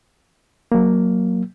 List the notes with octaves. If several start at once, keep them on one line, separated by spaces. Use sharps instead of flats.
F#3 A#3